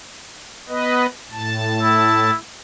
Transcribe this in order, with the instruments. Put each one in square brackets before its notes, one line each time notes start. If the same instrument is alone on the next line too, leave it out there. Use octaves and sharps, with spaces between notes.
[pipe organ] B3 B4 D#5
A2 A5
[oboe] E4